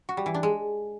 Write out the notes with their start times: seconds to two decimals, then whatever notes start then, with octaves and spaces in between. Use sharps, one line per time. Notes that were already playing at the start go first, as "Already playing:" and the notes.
0.09 F#4
0.17 G3
0.26 E3
0.34 D4
0.43 G#3